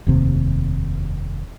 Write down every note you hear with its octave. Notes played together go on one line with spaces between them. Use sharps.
F1 D#2 C3